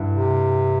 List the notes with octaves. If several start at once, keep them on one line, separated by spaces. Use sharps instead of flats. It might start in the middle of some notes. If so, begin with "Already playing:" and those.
Already playing: G2 D3 E4
C3